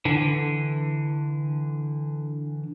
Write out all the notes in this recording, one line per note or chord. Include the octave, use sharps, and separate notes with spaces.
D3 E3